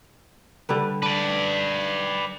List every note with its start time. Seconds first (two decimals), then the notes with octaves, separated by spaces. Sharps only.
0.69 D3 G3 B4
1.03 D4 B4 D5